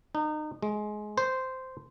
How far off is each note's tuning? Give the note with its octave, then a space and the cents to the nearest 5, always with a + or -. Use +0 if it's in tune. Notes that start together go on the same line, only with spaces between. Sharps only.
D#4 -30
G#3 +20
C5 -10